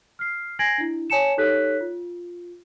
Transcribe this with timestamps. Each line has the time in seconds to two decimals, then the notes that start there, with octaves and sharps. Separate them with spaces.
0.19 F6 C7
0.59 G#5 G#6 A#6 C7 D7 F#7
0.78 D4 E4
1.10 C#5 G#5 A5 C#7 E7
1.37 D#4 G4 A4 C#5 F#6 B6
1.81 F4